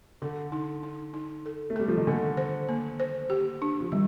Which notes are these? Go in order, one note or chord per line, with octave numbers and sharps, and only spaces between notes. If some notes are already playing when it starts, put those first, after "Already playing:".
D3 A4
D#4
D#4
D#4
A4
A3
G3 A4
F3
D#3
D3 A#3
C5
A#3
C5
G4
D4
F3
D#3 G3